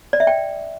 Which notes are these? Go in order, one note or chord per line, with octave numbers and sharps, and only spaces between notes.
D5
E5
G5